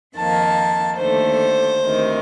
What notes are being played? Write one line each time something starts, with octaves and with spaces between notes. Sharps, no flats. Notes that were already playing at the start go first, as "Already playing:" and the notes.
F2 D#3 A#3 A5
D#2 D3 A3 C5
D2 C3 D#3